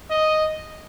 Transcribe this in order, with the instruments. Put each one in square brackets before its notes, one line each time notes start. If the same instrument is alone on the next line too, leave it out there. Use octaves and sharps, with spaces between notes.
[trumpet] D#5